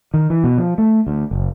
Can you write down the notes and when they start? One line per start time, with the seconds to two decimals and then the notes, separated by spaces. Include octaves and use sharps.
0.14 D#3
0.30 E3
0.44 B2
0.58 F3
0.78 A3
1.07 D2
1.31 F#1